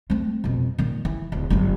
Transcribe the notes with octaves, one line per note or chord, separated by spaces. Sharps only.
A3 C4
F2 B2
A#2 D#3
E3
D1
G1 F#2